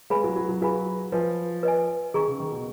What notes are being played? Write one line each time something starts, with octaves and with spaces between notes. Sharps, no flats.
G#3 G#4 B4 F5 G#5 B5
F#3
F#3
F#3
F#3 G#4 B4 F5 G#5 B5
F3 B4 D#5 G#5
B4 D#5 G#5
D#3 G#4 D#5 A#5 C#6
C#3
D#3
B2